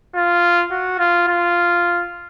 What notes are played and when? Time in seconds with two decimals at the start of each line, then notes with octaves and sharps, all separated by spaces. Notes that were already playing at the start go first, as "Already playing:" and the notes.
0.15 F4
0.71 F#4
0.99 F4
1.28 F4